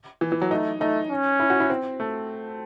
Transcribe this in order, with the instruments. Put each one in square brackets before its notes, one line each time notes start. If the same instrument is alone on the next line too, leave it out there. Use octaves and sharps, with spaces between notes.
[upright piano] E3
E3
F#3
[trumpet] A3 [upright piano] D#4
[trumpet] A3 [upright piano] D#4
[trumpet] C#4
[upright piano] E4
F#4
E4
C4
A3